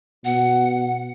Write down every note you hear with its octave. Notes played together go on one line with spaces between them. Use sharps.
B2 F#5